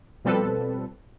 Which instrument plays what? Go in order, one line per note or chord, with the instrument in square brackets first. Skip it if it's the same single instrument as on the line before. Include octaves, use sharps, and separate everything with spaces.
[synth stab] B2 F3 G3 C4 A4 B4